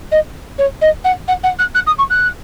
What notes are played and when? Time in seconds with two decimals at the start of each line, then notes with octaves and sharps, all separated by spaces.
0.11 D#5
0.58 C#5
0.81 D#5
1.04 F#5
1.27 F#5
1.43 F#5
1.58 F#6
1.74 F#6
1.86 D#6
1.98 C#6
2.10 F#6